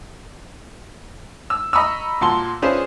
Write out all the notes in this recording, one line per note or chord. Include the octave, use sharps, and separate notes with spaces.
E6
D#5 A#5 B5 C#6 D#6 E6
A#2 F#4 A5 C6 G7
C#4 D4 F4 G#4 B4 C5